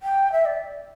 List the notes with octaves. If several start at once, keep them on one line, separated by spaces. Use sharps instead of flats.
G5
E5
D5